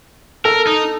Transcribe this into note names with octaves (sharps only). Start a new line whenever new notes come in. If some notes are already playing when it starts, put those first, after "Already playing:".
A4 A#4
D#4